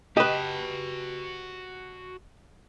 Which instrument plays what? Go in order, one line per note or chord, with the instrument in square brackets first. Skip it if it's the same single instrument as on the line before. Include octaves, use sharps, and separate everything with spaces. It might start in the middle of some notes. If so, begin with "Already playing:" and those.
[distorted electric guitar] F#4 A5 [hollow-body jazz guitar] G4 B4 [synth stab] D#5